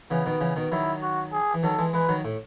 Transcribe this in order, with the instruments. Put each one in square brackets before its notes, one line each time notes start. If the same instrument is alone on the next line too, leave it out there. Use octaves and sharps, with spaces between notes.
[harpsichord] C#3 E3 [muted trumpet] B3
[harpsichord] B2 D#3
C#3 E3
B2 D#3
[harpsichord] D#3 F#3 [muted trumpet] E4
[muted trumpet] F#4
G#4
[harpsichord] E3
[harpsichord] D#3 F#3 [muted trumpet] A4
[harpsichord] E3 G#3
[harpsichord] E3 G#3 [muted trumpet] B4
[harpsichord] D#3 F#3
A2